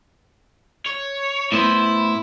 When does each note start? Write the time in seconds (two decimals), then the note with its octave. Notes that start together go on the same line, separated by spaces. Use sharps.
0.86 C#5
1.52 A2 B3 E4 C5